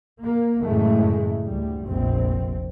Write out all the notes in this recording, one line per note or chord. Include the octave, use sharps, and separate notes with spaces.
A#3
F#2 A2 C#3 E3 G#3 A3
D2 G3
F1 A#1 C4